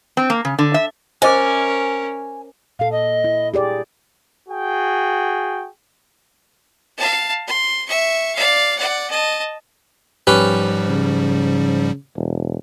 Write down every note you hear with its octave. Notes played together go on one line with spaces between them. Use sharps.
C4
A#3
C#3
D3
E5
C#4 A#4 C5 D#5 G#5 D6
A#2 A4 F5
D#5
E4
G4 G#4 D5
F#4 G#4 G5
F5 A5
C6
E5 C#6
D5 F5
D5 F#5
D#5 A5
G#2 F3 G3 C#4 G4 B4
C#3
E1